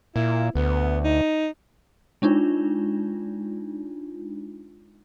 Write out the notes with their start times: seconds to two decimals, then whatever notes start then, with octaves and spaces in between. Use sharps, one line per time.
0.16 A#2 E4
0.55 D2 B3
1.04 D#4
2.22 G#3 D4 D#4 F4